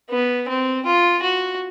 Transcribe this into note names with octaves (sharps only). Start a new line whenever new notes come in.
B3
C4
F4
F#4